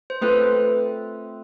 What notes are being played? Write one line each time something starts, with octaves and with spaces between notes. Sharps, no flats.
C5
A3 C4 F4 A4 B4